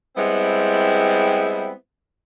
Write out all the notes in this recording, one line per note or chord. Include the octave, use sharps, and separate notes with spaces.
G3 G#3 B3 C4 E4